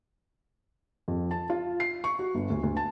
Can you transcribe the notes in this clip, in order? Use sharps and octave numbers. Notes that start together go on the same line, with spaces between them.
F2
A5
F4
C7
C#6
F#4
G1
D2
D2
A5